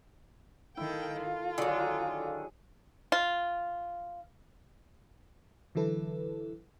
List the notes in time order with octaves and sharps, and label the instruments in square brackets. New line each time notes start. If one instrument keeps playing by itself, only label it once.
[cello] D#3 G5 [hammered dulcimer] E4 [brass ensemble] A4 F5
[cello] F4
[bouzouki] D3 D#3 [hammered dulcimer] F#3 G#4
[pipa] F4
[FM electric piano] D3 E3 F#3 E4 A4 B4